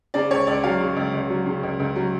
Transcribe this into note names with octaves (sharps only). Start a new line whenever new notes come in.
C#3 D5
C#2 C#5
C#2 D5
F#3 F5
C#3
C#2
C#2
F#3
C#3
C#2
C#2
F#3